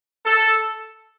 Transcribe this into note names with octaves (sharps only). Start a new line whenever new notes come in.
A4